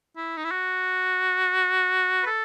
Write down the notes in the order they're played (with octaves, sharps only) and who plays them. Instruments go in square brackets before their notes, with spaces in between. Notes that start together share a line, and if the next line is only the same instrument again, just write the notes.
[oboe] E4
D#4
E4
F#4
B4
A4